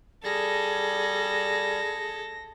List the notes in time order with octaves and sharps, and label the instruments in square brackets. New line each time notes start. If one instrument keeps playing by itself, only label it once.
[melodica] G3 [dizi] G#4 [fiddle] A4 [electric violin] A#6